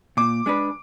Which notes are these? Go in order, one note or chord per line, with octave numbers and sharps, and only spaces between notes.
A#2 D6
G#3 D4 G#4 B4